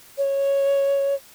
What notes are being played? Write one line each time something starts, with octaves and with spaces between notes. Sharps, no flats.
C#5